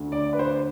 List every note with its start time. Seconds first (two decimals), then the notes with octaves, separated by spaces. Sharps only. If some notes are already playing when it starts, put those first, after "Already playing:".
Already playing: D2 D3
0.12 D5
0.33 B4
0.39 C5